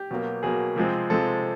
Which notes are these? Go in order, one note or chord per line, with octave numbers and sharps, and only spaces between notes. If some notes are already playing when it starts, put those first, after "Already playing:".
Already playing: G4
B2 F#3 A#3
B2 F#3 A#3 G#4
C3 F3 G#3 C4
C3 F3 G#3 C4 A4